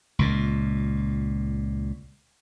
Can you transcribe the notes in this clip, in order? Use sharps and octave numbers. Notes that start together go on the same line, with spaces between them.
C#2 A#2